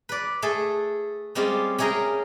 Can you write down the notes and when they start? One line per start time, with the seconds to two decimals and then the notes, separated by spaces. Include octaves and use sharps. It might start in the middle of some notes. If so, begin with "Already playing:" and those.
0.09 B4 D5
0.42 A3 G#4 A4
1.35 G3 G#3 C4 C#4 F4 G4
1.78 C#4 E4 G#4 A#4 G5 A#5